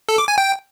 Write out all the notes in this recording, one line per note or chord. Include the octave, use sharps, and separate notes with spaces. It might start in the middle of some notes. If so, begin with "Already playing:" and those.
A4
D6
G#5
G5